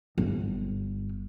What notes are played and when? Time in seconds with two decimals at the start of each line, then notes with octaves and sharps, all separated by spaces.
0.18 G1